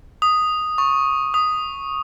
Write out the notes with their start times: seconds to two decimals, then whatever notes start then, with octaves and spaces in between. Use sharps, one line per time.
0.22 D#6
0.78 C#6
1.34 D#6